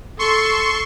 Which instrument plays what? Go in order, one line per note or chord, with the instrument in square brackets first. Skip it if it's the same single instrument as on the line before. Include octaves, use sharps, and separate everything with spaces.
[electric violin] A4 [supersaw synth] C6 C#6